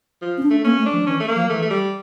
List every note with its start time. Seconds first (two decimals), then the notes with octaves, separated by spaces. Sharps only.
0.22 F3
0.37 C#4
0.43 D4
0.50 A3
0.64 A#3 C#4
0.79 A3
0.86 D4
0.93 F3
1.06 E3 C#4
1.20 A3
1.28 A#3
1.35 F3
1.49 E3 A3
1.62 A3
1.70 G3